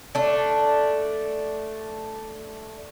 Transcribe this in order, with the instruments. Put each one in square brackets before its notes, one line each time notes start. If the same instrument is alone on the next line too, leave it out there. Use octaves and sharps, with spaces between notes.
[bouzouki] A3 D4